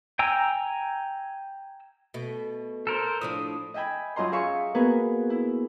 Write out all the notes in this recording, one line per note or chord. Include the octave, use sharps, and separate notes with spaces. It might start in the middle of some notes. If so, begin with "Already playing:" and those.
G5 G#5 A#5 E6
B2 A3
A4 A#4 C5
A2 F3 D4 D#6
D#5 E5 G5 G#5 B5
F#2 F#3 F4 D#5 A#5 C6
G#4 E5 F5 C#6
A#3 B3 F#4 G#4 A#4 B4
E4